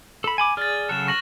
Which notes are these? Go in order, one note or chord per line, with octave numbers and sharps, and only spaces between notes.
A4 B5
G#5 B5 D6
G#4 D5 F6 A6
C#3 F#3 A4 F#6 E7
C#6 A#6 F#7